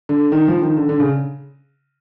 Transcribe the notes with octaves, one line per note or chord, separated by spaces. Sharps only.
D3
D#3
F3
D#3
D3
D3
C#3